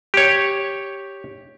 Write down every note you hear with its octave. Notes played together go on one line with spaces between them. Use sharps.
G4 C#5